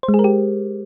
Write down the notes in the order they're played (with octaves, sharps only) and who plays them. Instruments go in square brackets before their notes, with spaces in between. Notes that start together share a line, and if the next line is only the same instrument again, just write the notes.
[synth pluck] C5
G#3
G#4
A#4
G4